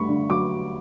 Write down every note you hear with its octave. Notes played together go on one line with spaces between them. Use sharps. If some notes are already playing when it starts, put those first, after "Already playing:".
Already playing: G2 A3 B5 C#6
D3
F#3 D6